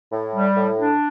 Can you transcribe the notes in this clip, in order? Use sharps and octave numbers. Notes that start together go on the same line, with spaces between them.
A2
G3
A2
D4